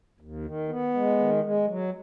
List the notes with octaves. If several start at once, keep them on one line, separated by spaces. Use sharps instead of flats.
D#2
D#3
B3
G#3
D#3
G#3
F#3